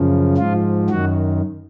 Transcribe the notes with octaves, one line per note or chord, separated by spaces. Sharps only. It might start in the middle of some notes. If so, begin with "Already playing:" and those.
Already playing: F#2 C#3 F3
G#2 F3 F4
F#2 D#3 F#4